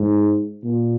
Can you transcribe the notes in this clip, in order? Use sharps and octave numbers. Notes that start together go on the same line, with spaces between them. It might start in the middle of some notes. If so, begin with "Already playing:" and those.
Already playing: G#2
A#2